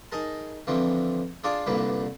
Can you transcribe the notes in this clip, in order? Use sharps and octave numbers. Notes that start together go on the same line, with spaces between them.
D#4 G#4 A#4 A5
D3 E3 F3 C4
D4 F4 G#4 D5 F5 A5
C2 G2 A#2 D3 A#3 B4